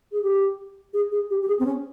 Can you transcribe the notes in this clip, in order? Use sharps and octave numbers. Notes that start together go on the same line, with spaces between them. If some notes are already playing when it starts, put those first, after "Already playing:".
G#4
G4
G#4
G#4
G4
G4
G#4
C4
C#4